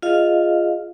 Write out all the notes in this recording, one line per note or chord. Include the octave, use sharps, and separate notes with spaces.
F4 G#4 D#5 F5